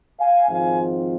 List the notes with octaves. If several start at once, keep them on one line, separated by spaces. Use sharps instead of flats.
F5 G#5
G#1 G#2 F3 C4 F4 F5 G#5